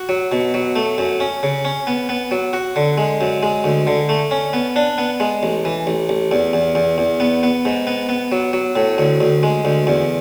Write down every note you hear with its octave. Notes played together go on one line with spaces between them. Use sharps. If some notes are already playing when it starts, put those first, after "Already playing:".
Already playing: F#4
F#3
B2
F#3
A3
F#2
C#4
C#3
C#4
B3
B3
F#3
F#4
D3
G#3
F#2
G#3
D2
D3
A3
C#4
B3
D4
B3
G#3
A1
E3
A1
A1
E2
E2
E2
E2
B3
B3
G#2
B3
B3
F#3
F#3
A2
D2
D2
G#3
D2
E2